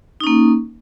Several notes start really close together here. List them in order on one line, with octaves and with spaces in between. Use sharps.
D#4 C#4 A#3